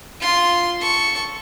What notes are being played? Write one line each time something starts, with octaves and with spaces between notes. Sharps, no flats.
F4 C6
A4 C#6